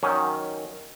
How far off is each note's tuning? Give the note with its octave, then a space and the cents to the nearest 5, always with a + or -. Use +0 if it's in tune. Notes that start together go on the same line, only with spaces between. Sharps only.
D#3 +0 F#3 +0 C#4 +0